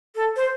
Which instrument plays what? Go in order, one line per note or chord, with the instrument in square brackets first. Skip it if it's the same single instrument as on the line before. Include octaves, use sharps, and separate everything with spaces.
[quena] A4
C5